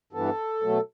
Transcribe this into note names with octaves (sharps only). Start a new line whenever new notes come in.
G2 E3 B3 A4
B2 F#3 A3